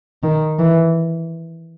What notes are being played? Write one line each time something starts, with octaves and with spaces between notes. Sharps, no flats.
D#3
E3